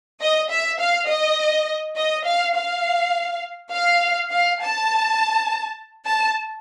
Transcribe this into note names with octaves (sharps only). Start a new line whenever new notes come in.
D#5
E5
F5
D#5
D#5
F5
F5
F5
F5
A5
A5